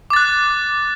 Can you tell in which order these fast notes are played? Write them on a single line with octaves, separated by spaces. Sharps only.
D6 A6 F#6